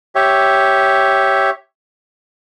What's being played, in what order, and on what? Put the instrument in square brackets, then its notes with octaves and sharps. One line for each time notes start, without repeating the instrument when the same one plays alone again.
[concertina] G4 C#5 E5